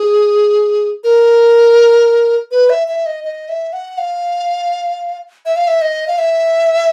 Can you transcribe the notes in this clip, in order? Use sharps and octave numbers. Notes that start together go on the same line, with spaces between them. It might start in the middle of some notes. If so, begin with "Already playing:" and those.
Already playing: G#4
A#4
B4
E5
E5
D#5
D#5
E5
F#5
F5
E5
F5
E5
D#5
F5
E5